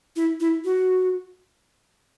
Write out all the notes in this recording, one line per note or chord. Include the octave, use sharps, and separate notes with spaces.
E4
E4
F#4